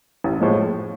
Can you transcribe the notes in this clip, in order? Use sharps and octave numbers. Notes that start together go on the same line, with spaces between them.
A1
A2 F3 G#3